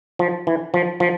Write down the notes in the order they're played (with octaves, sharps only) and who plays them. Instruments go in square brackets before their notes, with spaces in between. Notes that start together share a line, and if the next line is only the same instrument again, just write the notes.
[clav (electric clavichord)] F3
E3
F3
F3